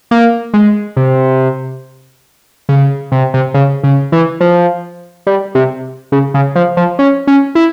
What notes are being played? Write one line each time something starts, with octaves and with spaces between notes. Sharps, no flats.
A#3
G#3
C3
C#3
C3
C3
C#3
C#3
E3
F3
G3
C3
C#3
C#3
F3
F3
C#4
C#4
E4